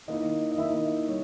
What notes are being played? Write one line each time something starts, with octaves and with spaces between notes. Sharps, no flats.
D#3 A#3 E4 D#5
D#5
D#3 A#3 E4 E5
G3 C#5